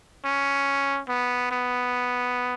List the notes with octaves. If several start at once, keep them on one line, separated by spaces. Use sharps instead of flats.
C#4
B3
B3